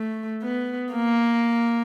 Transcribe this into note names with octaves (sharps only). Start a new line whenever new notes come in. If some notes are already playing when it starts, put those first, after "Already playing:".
Already playing: A3
B3
A#3